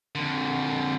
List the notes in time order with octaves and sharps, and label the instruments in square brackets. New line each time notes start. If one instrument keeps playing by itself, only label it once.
[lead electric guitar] F2 D3